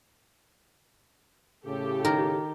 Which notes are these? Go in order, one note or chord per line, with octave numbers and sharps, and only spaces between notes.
A2 C#3 G4 A4
D#3 A#4